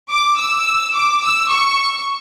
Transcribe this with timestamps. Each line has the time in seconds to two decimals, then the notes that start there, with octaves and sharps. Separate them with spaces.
0.11 D6
0.39 E6
0.95 D6
1.24 E6
1.51 C#6